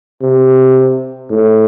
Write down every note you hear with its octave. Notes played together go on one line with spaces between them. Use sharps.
C3
A2